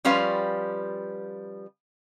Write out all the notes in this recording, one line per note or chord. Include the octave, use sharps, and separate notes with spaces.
F3 G3 C#4 F4 B4 F5